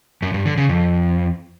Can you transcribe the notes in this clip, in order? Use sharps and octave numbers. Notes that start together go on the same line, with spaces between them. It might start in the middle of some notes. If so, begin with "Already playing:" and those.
F#2
G2
D3
C#3
F2